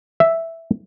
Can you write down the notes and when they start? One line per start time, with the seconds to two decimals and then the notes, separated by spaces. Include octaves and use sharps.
0.20 E5